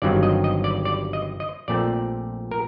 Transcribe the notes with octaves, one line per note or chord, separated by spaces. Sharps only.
G1 G2 D#3 F#3 C4 D5
D#5
D#5
D5
D5
D#5
D#5
A#1 A#2 A3 C4 D5
A#4